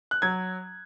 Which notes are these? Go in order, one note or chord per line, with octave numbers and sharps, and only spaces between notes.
F#6
F#3 G#6